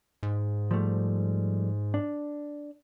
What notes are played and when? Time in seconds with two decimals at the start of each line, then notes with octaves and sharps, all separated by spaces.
0.23 G#2
0.71 F3 G3 A3
1.94 D4